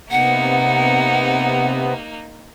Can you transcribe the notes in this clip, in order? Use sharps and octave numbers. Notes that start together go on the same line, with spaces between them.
C3 A#3 B3 D#4 F#5